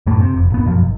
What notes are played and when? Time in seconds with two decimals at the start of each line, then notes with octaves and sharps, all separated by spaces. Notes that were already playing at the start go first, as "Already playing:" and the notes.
0.06 F#2 A2 A3 A#3
0.20 C3
0.34 F1
0.50 D#1 G#1 B3
0.66 F#2 B2 F3 F#3
0.80 G#1